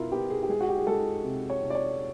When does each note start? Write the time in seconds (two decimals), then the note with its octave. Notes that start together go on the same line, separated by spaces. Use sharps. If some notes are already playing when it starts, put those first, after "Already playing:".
Already playing: B2 E4 F4 A#4
0.12 B3 G4
0.30 G#4
0.43 G4
0.49 G#3 G#4
0.61 F#4
0.69 G4
0.78 G#4
0.87 G#3 A4
1.24 C3
1.50 C#5
1.61 C3
1.70 D5
1.75 C#5